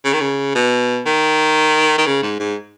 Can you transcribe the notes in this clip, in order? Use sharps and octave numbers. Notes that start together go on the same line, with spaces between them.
C#3
D#3
C#3
B2
D#3
D#3
C#3
G#2
G#2